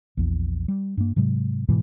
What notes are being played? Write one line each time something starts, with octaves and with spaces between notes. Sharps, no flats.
A#1 E2
G3
G2 A#3
G#2 C3 F#3 G#3
G#2 B2 E3 G#3